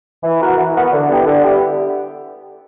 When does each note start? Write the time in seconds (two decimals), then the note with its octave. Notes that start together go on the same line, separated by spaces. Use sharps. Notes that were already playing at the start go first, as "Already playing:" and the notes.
0.24 E3
0.41 B3 F#4 A#4
0.58 E3
0.75 B3 F#4 A#4
0.92 D3
1.09 G3 B3 E4 G4
1.26 D3
1.43 G3 B3 E4 G4